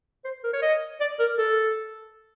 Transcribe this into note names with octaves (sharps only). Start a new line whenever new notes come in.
C5
A#4
C#5
D#5
D5
A#4
A4